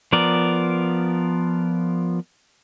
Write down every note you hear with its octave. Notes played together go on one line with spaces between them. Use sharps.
F3 B3 A#4 D5